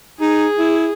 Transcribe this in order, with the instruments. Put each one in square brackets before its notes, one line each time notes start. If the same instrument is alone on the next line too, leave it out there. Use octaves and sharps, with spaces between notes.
[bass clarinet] D#4 [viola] G#4
[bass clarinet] E4